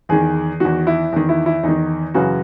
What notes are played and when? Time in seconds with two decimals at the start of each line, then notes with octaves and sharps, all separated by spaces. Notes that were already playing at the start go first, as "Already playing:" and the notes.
0.09 E2 D#3 G#4
0.60 E2 D#3 F#4
0.87 E4
1.12 E2 D#3
1.29 E4
1.46 E4
1.63 E2 D#4
1.69 D#3
2.14 F#2 C#3 E3 F#4